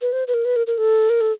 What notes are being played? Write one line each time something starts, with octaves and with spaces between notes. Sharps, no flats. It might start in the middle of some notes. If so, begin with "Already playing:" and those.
B4
C5
B4
A#4
B4
A#4
A#4
A4
A#4
A4